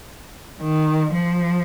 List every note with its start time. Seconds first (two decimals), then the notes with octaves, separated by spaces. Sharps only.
0.61 D#3
1.13 F3